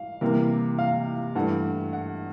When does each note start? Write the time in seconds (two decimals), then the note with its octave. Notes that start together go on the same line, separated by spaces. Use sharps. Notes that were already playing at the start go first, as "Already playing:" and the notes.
Already playing: F5
0.21 C3 E3 G3 A#3
0.78 F5
1.35 G2 E3 A3 F#5
1.93 F#5